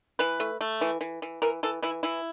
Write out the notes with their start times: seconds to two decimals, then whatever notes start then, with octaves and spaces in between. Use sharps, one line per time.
0.19 E3 B4
0.40 A3
0.61 A3
0.81 E3
1.01 E3
1.22 E3
1.42 E3 A#4
1.63 E3 A4
1.83 E3 E4
2.03 E3 E4